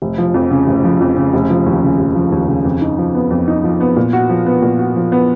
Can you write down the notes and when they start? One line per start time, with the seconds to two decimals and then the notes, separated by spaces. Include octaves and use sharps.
0.02 F1
0.18 F3
0.34 F2
0.51 C#3
0.67 F1
0.84 F3
1.01 F2
1.16 C#3
1.33 F1
1.50 F3
1.66 D#2
1.82 C#3
1.99 F1
2.15 F3
2.32 D#2
2.48 C#3
2.65 F2
2.81 D#4
2.98 F3
3.15 B3
3.30 F2
3.48 D#4
3.64 F3
3.81 B3
3.96 A#2
4.13 F#4
4.29 F3
4.46 B3
4.62 A#2
4.79 F#4
4.96 F3
5.12 B3